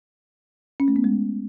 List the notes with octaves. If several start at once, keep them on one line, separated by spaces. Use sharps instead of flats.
C#4
A3
B3
G#3